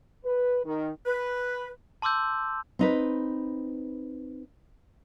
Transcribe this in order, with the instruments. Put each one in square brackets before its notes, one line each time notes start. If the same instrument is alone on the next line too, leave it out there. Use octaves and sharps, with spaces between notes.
[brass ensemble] B4
D#3
[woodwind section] B4
[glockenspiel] A5 C6 D6 E6 G6
[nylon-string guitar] C4 D#4 B4